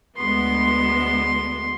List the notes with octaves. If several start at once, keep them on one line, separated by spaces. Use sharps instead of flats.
D2 G#3 B3 C6